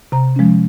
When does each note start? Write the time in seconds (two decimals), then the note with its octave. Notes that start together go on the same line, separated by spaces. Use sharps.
0.12 C3 A#5
0.36 F3 G#3 C#4